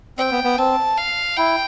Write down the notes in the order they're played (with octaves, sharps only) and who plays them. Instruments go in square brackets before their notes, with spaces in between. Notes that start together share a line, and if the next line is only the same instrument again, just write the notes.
[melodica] C4 [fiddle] G5
[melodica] B3
B3
[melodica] C4 [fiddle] A5
[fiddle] F5
[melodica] E4 [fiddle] G5